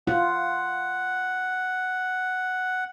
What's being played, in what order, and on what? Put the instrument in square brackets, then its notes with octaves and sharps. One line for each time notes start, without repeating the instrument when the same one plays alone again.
[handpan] F4 [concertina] F#5